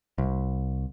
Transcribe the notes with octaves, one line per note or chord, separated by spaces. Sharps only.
C2